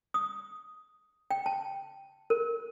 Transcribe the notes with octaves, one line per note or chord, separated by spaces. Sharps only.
D#6
G5
A5
A#4